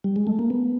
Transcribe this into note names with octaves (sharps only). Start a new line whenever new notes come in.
G3
G#3
A3
A#3
B3